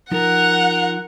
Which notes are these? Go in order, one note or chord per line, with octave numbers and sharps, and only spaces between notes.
F3 D#4 F4 A#4 F#5